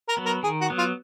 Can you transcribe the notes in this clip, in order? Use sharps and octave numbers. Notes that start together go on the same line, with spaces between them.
A#4
F#3 B3
A#4
D#3 G#4
F#4
F#3 B3
F4